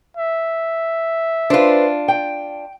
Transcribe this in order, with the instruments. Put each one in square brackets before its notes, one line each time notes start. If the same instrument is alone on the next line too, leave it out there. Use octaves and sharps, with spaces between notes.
[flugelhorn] E5
[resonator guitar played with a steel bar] D4 F4 [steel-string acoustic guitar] B4 C5
[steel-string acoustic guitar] G5